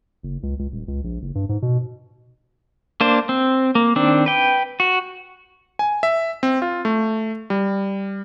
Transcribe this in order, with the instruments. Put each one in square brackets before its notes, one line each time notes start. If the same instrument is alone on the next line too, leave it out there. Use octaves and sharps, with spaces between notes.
[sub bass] F#1
C#2
C#2
D#1
C#2
A#1
F#1
G2
G#2
B2
[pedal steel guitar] A#3 D4 C5
C4
A#3
D#3 C4 D4
B4 G5
F#4
[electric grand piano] G#5
E5
C4
F4
A3
G3